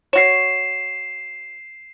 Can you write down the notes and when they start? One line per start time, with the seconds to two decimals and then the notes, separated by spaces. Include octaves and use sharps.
0.13 F#4 C#5 C7 E7